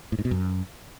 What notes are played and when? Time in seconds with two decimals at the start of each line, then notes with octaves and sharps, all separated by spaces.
0.12 A2
0.19 G#2
0.25 B2
0.31 F#2